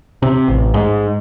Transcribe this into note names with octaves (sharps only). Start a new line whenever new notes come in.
C3
A1
G#2